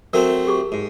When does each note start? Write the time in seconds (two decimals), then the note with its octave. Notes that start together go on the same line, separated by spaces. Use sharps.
0.13 F#3 A3 C4 A#4
0.47 G4 G#4 C#6
0.72 G#2